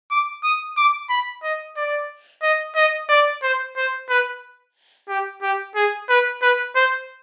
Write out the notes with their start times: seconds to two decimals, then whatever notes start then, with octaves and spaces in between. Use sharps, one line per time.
0.11 D6
0.44 D#6
0.77 D6
1.10 B5
1.44 D#5
1.77 D5
2.43 D#5
2.76 D#5
3.09 D5
3.43 C5
3.77 C5
4.10 B4
5.08 G4
5.42 G4
5.75 G#4
6.09 B4
6.42 B4
6.75 C5